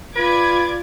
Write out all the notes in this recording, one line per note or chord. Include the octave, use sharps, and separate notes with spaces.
F4 B4 D5 D6 G#6